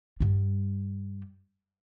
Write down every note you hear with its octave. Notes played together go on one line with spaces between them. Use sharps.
G2 G3